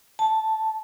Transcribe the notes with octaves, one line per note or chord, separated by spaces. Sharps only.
A5